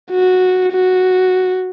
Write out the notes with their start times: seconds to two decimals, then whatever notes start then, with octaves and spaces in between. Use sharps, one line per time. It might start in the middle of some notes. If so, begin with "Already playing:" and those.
0.11 F#4
0.72 F#4